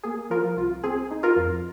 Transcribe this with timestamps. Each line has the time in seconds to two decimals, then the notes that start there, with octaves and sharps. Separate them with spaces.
0.03 A#3 G#4
0.30 F3 F4 A#4
0.57 C2 F4
0.83 C4 G#4
1.11 D#4
1.23 F4 A#4
1.36 F2